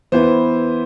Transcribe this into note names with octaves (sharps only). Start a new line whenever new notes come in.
E3 B3 E4 C5